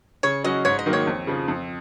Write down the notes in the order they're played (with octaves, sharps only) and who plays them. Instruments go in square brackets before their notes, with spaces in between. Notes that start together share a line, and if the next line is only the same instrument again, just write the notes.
[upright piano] C#3 [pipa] C#5
[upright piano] F#3 C#4 F#4 [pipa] D#5
[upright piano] G#2 [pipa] C#5
[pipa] D#5
[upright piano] D#3 F#3 A#3 D#4
[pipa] C#5
[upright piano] F2
C#3 F3
F2